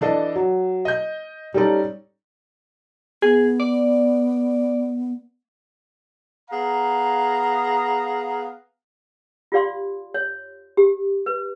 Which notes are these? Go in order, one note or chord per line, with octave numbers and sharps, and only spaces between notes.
E3 D4 A4 D#5
F#3
D#5 G6
G3 C#4 D#4 A4 D5
B3 G#4
D5
B3 G#4 F5 A#5
F4 G4 D5 F5 C6
C#5
G4
B4